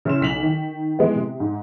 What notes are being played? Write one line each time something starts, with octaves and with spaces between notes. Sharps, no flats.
C#3 E4 C6 E7
B1 B6 F7 F#7
D#3
E3 G#3 B3
C3
G#2